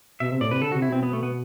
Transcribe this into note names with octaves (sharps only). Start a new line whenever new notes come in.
B2 E5
C3
A2 D5
C3 B4
D3 A4
C3 F#4
E4
B2 C4
B3
A3
B3